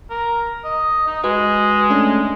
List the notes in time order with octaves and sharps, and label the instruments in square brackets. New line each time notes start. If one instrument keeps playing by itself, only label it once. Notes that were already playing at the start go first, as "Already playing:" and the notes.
[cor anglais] A#4
D#5
D#4
[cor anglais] G#3 [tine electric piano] F#4 B4 D#5
[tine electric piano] A3 C#4 D4